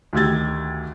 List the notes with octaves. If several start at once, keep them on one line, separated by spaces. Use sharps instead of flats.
D2 D#3 G4 E6 G#6 A6